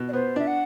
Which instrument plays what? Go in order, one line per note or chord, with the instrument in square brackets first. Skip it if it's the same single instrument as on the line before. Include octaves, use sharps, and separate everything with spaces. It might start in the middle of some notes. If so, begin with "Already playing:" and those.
Already playing: [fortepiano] B2
[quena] D5
[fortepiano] B3 [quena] C5
[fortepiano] D4 [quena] E5
[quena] F#5